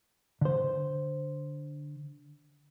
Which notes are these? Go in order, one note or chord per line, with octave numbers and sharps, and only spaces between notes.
D3 C5